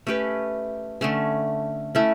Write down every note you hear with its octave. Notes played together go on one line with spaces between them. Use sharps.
A3 C#4 G4 B4
D3 A3 C#4
A3 C#4 E4